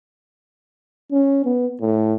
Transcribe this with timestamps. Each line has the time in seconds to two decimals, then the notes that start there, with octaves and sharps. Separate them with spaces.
1.11 C#4
1.45 B3
1.81 A2